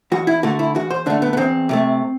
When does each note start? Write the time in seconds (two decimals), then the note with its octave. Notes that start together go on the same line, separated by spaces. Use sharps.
0.12 E2 F#4
0.27 E4
0.43 D3 A3 F#4
0.59 E4
0.75 E2 F#4
0.91 C5
1.06 D3 A3 D4
1.22 B3
1.33 B3
1.37 E2 C4
1.69 C3 F#3 A3